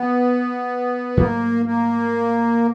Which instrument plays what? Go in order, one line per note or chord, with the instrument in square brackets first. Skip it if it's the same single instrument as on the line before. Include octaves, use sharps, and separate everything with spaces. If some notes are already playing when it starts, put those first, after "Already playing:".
Already playing: [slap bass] E3 [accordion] B3
[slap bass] G#2 D#3 F#3 A3 [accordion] A#3
[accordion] A#3